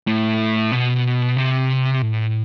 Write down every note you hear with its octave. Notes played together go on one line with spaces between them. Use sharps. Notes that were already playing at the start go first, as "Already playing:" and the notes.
A2
B2
C3
A2